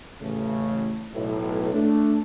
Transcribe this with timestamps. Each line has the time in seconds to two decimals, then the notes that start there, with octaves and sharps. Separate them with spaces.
0.21 A1 A2 C#3 A3
1.14 B1 A2
1.73 A3 D4